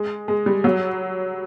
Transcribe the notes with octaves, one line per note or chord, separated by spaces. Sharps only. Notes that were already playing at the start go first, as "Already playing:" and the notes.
Already playing: G#3
G#3
G3
F#3